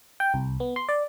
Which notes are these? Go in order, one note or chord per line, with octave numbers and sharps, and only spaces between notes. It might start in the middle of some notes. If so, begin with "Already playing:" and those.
G5
C2
B3
C6
D5